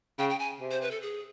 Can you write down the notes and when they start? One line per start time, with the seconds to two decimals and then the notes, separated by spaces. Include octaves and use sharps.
0.19 C#3 G5
0.30 G5
0.39 G#5
0.61 C3
0.71 C5
0.82 B4
0.91 A4
1.02 G#4